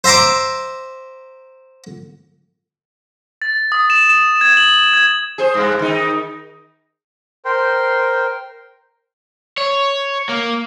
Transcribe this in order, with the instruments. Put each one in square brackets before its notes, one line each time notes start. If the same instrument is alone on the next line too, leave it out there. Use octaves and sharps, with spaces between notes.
[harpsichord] C5 E5 A#5 C6 D6
[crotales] A6
D#6
E7
E7
G#6
F#7
G#6
[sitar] G#4 C5
G2 G#3
D#3 D#4
[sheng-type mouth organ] A#4 C5 G5 C6
[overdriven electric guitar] C#5
A#3